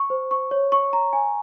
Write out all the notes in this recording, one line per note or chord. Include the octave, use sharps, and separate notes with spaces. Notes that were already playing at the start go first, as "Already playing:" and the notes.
Already playing: C#6
C5
C#6
C#5
C#6
A#5
G#5